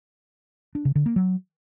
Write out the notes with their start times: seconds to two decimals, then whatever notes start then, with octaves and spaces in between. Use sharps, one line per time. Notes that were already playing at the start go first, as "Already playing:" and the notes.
0.75 D4
0.85 C#3
0.95 D3
1.06 A#3
1.16 F#3